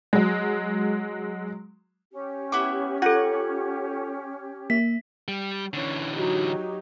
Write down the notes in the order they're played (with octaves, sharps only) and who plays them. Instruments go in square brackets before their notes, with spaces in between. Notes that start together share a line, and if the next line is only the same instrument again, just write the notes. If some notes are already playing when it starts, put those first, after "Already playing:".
[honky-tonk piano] F#3 G#3
[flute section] C#4 G4
[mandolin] B3 E4 D6
[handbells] F4 A4 [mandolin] F#5 [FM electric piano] G#6
[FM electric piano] A#3 E5 [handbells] B6
[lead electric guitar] G3
[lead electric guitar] D3 E3 [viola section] C#4
[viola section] F#3 D#4 G4